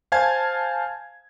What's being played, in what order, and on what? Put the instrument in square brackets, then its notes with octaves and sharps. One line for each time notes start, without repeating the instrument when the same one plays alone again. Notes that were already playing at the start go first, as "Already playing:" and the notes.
[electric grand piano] C5 F5 G#5 A5 G#6